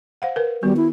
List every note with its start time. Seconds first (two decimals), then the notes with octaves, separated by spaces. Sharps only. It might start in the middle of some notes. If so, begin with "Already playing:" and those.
0.22 C5 F5 F#5
0.36 A#4 B4
0.63 D#3 G3 B3 F#4
0.77 E4